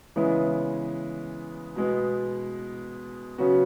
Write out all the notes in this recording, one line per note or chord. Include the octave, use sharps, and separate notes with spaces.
C#3 E3 G#3 B3 E4
B2 G#3 B3
C#3 F#3 B3 F#4